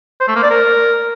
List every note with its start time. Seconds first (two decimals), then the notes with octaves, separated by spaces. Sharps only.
0.20 C5
0.28 A3
0.35 A#3
0.43 D5
0.51 A#4